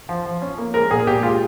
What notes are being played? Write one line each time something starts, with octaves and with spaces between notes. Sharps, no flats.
F3
F3
C#4
A#3
G#3 A#4
A#2 G#4
A#2 G4
G#3 F4